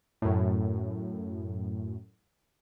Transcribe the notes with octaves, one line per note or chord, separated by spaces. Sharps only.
F#2 A2